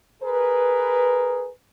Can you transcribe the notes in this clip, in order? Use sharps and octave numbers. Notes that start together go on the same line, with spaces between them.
G#4 A#4 B4